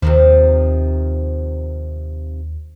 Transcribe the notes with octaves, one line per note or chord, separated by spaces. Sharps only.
D#2 C3 D#3 F3